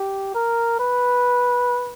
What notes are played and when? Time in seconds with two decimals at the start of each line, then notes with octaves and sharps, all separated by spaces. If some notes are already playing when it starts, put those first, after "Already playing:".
Already playing: G4
0.35 A#4
0.80 B4